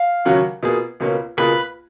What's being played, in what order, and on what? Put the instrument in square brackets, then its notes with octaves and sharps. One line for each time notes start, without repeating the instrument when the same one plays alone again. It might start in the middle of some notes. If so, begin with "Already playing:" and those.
Already playing: [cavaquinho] F5
[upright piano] D#2 C#3 F#3 C#4 F#4
B2 A#3 F4 G#4
C#2 B2 A#3 C#4
[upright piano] C#2 B2 A#3 F4 G#4 [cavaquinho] B4